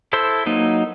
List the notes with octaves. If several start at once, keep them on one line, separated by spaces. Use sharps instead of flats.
E4 A4 C5 C6 E6
F#3 A#3 D#4